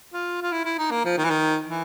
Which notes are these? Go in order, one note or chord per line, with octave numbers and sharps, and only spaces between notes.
F4
F4
E4
E4
D#4
A#3
F3
D#3
E3
D#3
E3